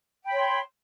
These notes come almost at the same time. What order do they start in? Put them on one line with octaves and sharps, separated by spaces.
G5 B5 C#5 C6